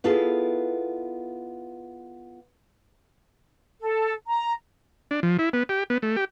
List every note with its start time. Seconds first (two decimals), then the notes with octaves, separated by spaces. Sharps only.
0.04 B3 E4 F4 G#4 A4
3.79 A4
4.28 A#5
5.11 D4
5.23 F3
5.39 E4
5.53 B3
5.69 G4
5.90 B3
6.02 A3
6.16 G4